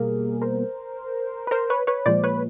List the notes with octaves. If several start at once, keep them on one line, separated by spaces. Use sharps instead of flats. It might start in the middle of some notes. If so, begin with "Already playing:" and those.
Already playing: B2 G3 A#3 G#4 A#4
A#4 C5
B4
A#4 C5
B4 C#5
B4 C#5
A#2 F3 G#3 C5 D5
B4 C#5